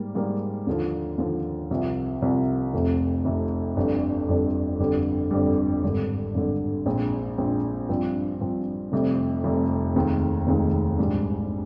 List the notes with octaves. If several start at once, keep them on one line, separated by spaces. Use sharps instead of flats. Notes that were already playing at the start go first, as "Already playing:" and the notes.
Already playing: G#2 G3 A#3
G#2 G3 A#3
D#2 D3 F3
D#2 D3 F3
C2 C3 F3
C2 C3 F3
F1 F2 C3
F1 F2 C3
G1 F2 D3 G3 D4
G1 F2 D3 G3 D4
G1 F2 D3 G3
G1 F2 D3 G3
G#1 G2 D3
G#1 G2 D3
A#1 A#2 G#3 C4
A#1 A#2 G#3 C4
G2 F3 C4
G2 F3 C4
F1 F2 C3 G3
F1 F2 C3 G3
F1 D#2 D#3 G#3 C4
F1 D#2 D#3 G#3 C4
A#1 G#2 G3